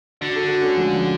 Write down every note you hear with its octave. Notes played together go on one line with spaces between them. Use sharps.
D3 D4 F#4
F#4 A4
F#4 A4
A3 C#4
F3 G#3